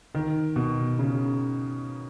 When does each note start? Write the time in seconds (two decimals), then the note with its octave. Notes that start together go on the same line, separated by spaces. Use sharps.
0.15 D#3
0.56 B2
0.99 C#3